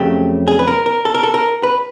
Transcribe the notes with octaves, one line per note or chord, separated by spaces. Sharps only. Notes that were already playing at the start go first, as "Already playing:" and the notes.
Already playing: F2 C#3 F#3 A3 G4
G#4
B4
A#4
A#4
A4
A#4
A4
A#4
B4